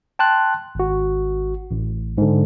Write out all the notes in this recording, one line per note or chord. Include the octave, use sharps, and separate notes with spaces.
G5 A5 C6 F#6
G#1 F#4
A1
G#2 D3